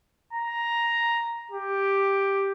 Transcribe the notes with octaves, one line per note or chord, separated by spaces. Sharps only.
A#5
G4